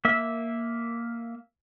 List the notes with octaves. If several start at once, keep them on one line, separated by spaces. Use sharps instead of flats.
A#3 E5